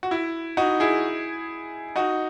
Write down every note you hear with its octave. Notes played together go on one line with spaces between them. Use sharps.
F#4
E4
D#4 F#4
E4 G#4
D#4 F#4